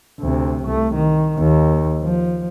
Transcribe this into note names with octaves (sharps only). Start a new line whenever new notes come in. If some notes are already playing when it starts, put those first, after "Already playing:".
D2 C3
C2 A3
D#3
D#2
F3